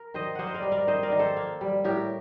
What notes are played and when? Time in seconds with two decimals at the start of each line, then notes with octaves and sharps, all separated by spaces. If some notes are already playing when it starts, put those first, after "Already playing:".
Already playing: A#4
0.14 D#3 C5 D#5
0.35 A#3 C5 D#5 F#5
0.47 C5
0.54 A#4 D5
0.63 G3
0.72 A#4 D5
0.87 D#3 C5 D#5
1.03 A#4 D5
1.12 D#3
1.19 A4 C5
1.37 A#3
1.61 G3
1.84 A2 G4 A#4